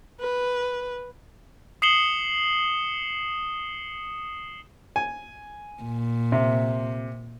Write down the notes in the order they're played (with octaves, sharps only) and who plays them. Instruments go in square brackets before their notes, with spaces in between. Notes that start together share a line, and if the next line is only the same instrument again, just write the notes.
[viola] B4
[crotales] D#6 C7 C#7 E7 F#7 G7
[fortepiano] G#5
[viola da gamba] A#2
[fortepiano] C3